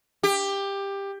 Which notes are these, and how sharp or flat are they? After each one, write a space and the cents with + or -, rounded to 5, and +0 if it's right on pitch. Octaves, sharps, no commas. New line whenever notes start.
G4 +15